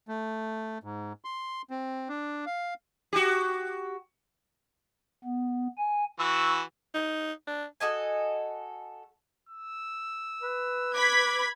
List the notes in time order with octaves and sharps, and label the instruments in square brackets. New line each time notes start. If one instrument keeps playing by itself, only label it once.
[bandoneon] A3
G#2
C6
C4
D4
F5
[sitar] F#4 G4
[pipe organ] B3
G#5
[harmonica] E3 F#4 E6 [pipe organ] C#6
[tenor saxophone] D#4
D4
[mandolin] F#4 A4 D#5 G#5
[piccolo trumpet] E6
[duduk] B4
[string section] B5 G#6 B6 [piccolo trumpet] D6